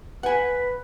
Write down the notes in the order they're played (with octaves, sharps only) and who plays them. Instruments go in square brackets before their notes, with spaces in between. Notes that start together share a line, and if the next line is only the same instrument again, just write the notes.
[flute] B4 [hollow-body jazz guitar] F#5 G#5